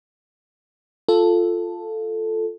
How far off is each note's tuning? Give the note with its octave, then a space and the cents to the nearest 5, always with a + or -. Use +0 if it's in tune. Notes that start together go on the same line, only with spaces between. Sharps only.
F4 +0 A4 +0